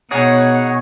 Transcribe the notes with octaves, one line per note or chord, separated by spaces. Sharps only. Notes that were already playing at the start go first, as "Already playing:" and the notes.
B2 D#4 G#4 C#5 F#5